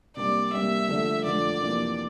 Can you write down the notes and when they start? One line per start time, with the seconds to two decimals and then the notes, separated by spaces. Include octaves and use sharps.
0.16 C3 G3 A#3 D4 D5
0.53 C3 G3 A#3 D4 E5
0.88 D3 F3 A3 D4 A4
1.24 D3 F3 A3 D4 A4 D5
1.61 F2 C3 E3 A#3 D4